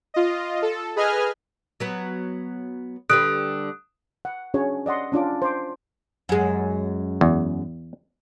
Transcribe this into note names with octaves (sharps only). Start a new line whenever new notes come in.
F4 D#5
A4
G#4 B4 D#5 G#5 F6
F#3 B3
D3 G3 B4 D#6 F#6 D7
F#5
C#4 D4 F#4 G#4 C#5
D5 D#5 F#5 C6
C#4 D4 F4 D6
C5 D6
F#2 G#3
E2